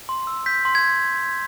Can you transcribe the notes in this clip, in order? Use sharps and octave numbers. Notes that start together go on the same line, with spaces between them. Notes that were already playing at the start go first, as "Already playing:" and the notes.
C6
E6
G6 B6
C6
G#6